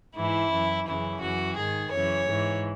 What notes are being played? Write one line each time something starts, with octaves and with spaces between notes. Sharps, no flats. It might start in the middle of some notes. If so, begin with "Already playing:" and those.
G#2 E3 E4
F#2 E3
F#2 C#3 E3 E4
F#2 E3 F#4
G#2 D#3 G#4
F#2 C#3 E3 C#5
G#2 E3